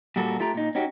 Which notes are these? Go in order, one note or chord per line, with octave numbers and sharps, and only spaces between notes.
A#2 G3 F#4 A4 A#4
A3 F4 G4 A#5
A#2 D#4
C#4 D#4 F#4 G4